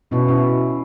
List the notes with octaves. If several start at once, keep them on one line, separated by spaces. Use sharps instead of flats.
B2 C#4 E4
C#4 E4